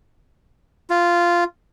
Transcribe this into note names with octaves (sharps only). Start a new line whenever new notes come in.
F4